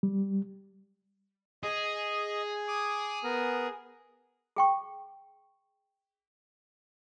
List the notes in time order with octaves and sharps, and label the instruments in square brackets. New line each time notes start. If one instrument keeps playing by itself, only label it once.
[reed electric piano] G3
[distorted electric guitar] G#4 [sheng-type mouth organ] D#5
[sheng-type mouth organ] D6 D#6
B3 A#4
[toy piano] G#4 G5 C#6